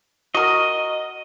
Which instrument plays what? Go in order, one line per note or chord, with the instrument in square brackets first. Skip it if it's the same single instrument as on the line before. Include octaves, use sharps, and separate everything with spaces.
[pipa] F#4 A#4 [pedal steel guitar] D#5